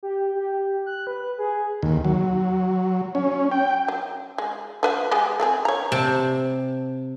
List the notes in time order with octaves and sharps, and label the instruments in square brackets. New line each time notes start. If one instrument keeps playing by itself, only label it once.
[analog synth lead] G4
G4
F#6
B4
G#4
[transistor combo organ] D#2
F#3
C#4
G5
[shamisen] F#3
G#3
F3 B4 F#5
G#3 B3 G4
A3 C4 G#4
C#5 A#5
[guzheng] C3 A5